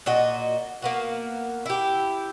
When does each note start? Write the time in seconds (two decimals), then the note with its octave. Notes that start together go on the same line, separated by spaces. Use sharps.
0.06 A#2 F#4 D#5
0.82 A#3 B3 F#4
1.66 E4 G4